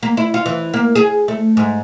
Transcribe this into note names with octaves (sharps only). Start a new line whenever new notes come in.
A#3
E4
F4
E3
A#3
G#4
A3
G#2